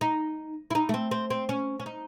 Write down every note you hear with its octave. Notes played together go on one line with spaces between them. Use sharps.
D#4
E4
D#4
A3
C4
C4
C4
C#4
C#4
D#4